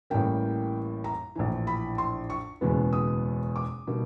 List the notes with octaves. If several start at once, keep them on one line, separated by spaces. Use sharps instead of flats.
A1 A2 E3 G3 A#3 G5
A#5
A#1 A2 E3
B5
C6
C#6
F#1 E2 B2 G#3 B3
D#6
D6
B2 G3 A#3 D#4